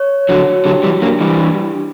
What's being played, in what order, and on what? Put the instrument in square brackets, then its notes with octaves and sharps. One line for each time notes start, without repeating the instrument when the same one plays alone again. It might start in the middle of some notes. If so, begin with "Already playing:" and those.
Already playing: [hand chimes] C#5
[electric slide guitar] D3 F#3 [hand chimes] F#4
[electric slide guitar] D3 F#3 [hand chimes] G4
[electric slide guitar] E3 G3
[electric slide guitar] F#3 A#3 [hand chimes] D4
[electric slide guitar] E3 G3
[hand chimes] G4
D4